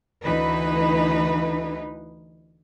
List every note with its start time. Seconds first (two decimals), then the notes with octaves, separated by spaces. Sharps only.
0.23 D2 E3 D#4 B4